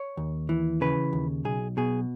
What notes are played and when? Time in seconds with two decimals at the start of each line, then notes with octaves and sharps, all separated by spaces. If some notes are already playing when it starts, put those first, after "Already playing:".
Already playing: C#5
0.17 D#2
0.49 E3
0.81 C#3 B4
1.13 D#2
1.45 B1 G#4
1.77 B2 G#4